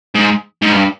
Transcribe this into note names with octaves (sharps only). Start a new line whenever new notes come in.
G#2
G#2
G2